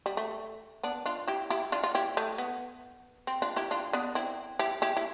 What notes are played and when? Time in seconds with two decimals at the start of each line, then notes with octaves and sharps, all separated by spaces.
0.06 G3
0.17 A3
0.83 B3 D4
1.06 D4 F4
1.28 E4 G4
1.50 E4 G4
1.72 D4 F4
1.84 F4
1.95 E4 G4
2.17 A3
2.38 B3
3.27 C4
3.42 D4 F4
3.56 E4 G4
3.71 D4 F4
3.93 B3 D4
4.15 C4 E4
4.59 E4 G4
4.82 E4 G4
4.97 E4